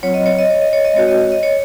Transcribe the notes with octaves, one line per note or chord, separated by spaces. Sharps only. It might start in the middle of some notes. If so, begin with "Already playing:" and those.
F#3 C4 F4 C#5
D#5
C#5
D#5
C#5
D#5
C#5
D#5
G#3 C4 F#4 C#5
D#5
C#5
D#5
C#5